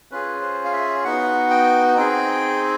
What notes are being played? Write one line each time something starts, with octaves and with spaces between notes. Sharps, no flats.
C#4 F4 G#4 B4
C5
F5
E5
B3 D#4 F#4 F#5
G5
C4 D#4 G#4 G5